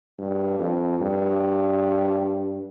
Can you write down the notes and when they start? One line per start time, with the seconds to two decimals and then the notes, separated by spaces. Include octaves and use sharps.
0.19 G2
0.59 F2
1.00 G2